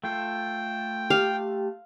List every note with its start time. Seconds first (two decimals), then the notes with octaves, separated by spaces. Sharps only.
0.04 A3 F4 A4 G5
1.10 G4 F5